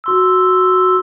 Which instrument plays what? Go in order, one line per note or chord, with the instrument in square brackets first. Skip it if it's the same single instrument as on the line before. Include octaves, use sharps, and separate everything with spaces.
[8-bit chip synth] F#4 C6 E6